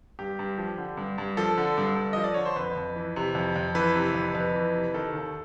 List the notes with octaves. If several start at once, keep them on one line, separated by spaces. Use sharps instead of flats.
G2 G4
G2
F3
D3
G2
G2
F3 A4
D3
G2
G2
F3 D#5
D5
D3 C#5
C5
F2 B4
F2
E3
C3
F2
F2
E3 B4
C3
F2
F2 B4
E3
C3
D#3 A4
D#2